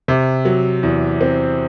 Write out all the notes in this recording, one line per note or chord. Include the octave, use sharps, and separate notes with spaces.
C3
F#3
E2
C4